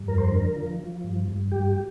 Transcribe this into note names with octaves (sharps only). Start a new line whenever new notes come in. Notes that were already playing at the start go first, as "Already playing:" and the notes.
Already playing: G2
F2 A#4
C5
D3 A#4
F3
F3
G2
G2
G2 G4